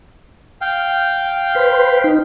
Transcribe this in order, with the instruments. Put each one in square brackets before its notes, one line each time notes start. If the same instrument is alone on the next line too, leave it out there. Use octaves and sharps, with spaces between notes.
[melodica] F5 G5
[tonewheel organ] B4 C5
D#4